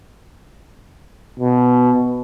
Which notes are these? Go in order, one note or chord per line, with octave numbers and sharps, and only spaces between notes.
B2